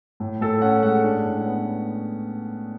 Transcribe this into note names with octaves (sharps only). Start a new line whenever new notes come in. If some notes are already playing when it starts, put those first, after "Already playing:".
A2
A2 A4
C#4 F#5
G#3 F#5
D4
A2
B3